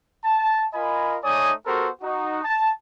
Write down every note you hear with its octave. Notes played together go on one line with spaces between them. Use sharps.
A5
F4 A#4 D#5 G#5 B5
A3 D#4 C#5 D5 G#5 D#6
B3 F#4 G4 A4 A#4 C5
D#4 F#4
A5